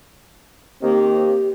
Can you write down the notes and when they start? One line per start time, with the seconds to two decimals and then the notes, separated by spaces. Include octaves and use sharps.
0.82 D#3 A#3 C4 G4